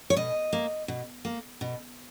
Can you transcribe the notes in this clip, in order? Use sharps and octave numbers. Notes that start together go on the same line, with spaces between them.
C#5
B2 D#5
A#3
B2
A#3
B2